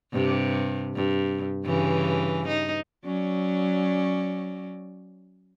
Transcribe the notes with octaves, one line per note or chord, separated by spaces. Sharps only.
G2 C3
G2
G2 C#3 E3
D#4
F#3 C#4 D5